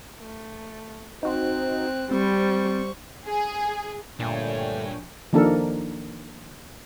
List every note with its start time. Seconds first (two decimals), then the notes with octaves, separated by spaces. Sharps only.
0.20 A3
1.23 C4 D#4 F#4 C5 F#6
2.11 G3 C4 C5 C#6
3.26 G#4
4.20 A#2 D3 G3 A3 D4 C#5 G5 G#5
5.33 D#3 F3 A#3 D4 A4 A#4